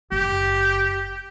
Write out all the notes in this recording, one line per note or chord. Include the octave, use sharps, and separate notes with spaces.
F#1 G4